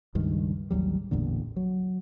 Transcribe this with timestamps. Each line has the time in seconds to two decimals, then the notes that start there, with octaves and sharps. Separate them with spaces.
0.15 C#2 G2 D#3
0.71 A1 D#2 F#3 G3
1.11 A1 E2 A#2 D3
1.56 F#3